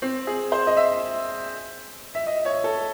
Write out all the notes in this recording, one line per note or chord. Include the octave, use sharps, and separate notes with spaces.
C4
G#4
C5
D#5
E5
E5
D#5
C#5
A4